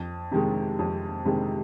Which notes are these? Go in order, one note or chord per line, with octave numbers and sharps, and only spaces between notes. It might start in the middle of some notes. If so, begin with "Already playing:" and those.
Already playing: F2
C3 D#3 G#3
F2
C3 D#3 G#3